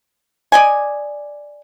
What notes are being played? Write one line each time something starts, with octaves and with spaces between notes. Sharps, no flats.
D5 D#5 G#5